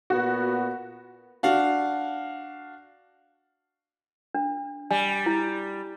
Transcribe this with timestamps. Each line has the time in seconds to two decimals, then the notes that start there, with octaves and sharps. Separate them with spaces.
0.10 A#2 B3 F#4
1.43 D4 F#4 F5
4.35 D4
4.91 G3 G#5
5.26 E4